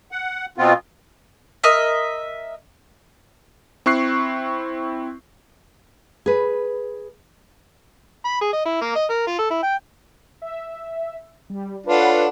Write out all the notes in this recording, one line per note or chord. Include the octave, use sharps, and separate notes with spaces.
F#5
B2 B3 C4 F4
A#4 D#5 E5
C4 E4 C#6 F#6 C7
G#4 B4
B5
G#4
D#5
E4
A#3
D#5
A#4
F4
A4
E4
G5
E5
G3
D4 F4 A4 B4 C#5 F#5